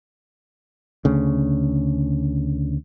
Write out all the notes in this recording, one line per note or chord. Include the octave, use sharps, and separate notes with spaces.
D2 C#3